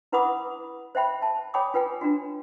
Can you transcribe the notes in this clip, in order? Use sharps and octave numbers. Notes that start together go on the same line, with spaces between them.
E4 B4 F#5 B5 D6 D#6
C5 E5 G5 B5
E5 A5
C#5 G5 G#5 B5 D6 D#6
F4 B4 G5 G#5
D4 F4 F#4